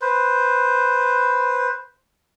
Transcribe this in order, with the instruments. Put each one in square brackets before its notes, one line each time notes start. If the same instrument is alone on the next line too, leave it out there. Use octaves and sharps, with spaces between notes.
[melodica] B4 C5